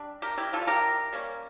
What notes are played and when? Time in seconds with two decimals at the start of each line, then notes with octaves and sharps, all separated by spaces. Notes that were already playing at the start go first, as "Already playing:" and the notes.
Already playing: G3 D4
0.22 G4 A#4
0.38 E4 G4
0.53 C#4 E4 F4 A4
0.57 G3
0.67 G4 A#4
1.13 G3 A#3 C#4